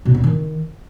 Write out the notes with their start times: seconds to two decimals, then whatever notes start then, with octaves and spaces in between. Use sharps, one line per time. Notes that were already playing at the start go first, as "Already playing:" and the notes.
0.05 B2
0.14 C4
0.24 D#3